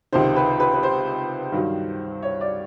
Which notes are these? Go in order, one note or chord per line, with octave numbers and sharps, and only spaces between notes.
C#2 C3 D#3 C5
B4
B4
B4
C5
G2 D#3 F#3
C#5
D5